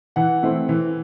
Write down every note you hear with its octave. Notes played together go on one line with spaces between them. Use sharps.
E3 F#5
A3 C4 E4
E3